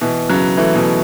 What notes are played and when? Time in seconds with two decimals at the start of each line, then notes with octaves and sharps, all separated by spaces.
0.01 B2 E3
0.29 C#3 F#3
0.57 E3 A3
0.75 B2 E3